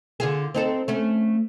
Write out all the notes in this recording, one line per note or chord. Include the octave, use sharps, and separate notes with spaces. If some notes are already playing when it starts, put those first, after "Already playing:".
D3 F4 G#4
C4 D#4 A4
A3 C#4